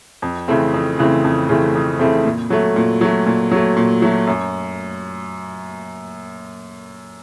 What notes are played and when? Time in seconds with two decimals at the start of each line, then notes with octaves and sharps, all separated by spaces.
0.22 F2
0.48 C#3 E3 A3 C4
0.74 F2
0.99 C#3 E3 A3 C4
1.25 F2
1.49 C#3 E3 A3 C4
1.75 F2
1.99 C#3 E3 A3 C4
2.25 A#2
2.50 F#3 A3
2.76 A#2
3.01 F#3 A3
3.26 A#2
3.51 F#3 A3
3.76 A#2
4.02 F#3 A3
4.27 F#2